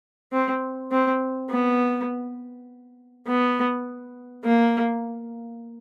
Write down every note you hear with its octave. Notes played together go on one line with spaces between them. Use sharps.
C4
C4
B3
B3
A#3